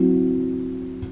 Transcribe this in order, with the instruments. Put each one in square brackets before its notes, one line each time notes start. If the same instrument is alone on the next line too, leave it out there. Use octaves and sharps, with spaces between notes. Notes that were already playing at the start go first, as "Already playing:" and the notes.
Already playing: [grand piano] F#3 C4 E4